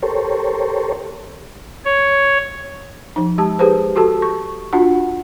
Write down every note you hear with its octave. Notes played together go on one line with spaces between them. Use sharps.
G4 A4 A#4 C5 C#5
C#5
F3 D#4
G#3 G4 A5
G4 G#4 B4 C5
F#4 G4 A4 A5
C#6
D4 F4 F#4 F#5